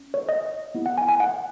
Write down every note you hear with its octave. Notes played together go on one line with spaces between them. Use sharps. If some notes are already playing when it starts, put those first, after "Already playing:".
Already playing: C#4
C#5
D#5
B3 E4 G4
F#5
G#5
G#5
F#5